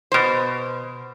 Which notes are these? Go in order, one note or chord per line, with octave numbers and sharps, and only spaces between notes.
B2 C5